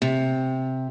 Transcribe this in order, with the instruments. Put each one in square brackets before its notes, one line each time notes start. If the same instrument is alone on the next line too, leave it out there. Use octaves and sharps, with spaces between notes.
[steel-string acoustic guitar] C3